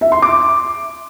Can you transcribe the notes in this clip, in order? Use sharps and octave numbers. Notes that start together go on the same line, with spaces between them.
E5
C6
D6